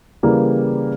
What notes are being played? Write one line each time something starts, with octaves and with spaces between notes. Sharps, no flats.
C#3 E3 G3 A#3